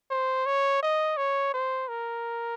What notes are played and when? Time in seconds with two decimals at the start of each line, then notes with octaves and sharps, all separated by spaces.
0.10 C5
0.46 C#5
0.82 D#5
1.17 C#5
1.53 C5
1.88 A#4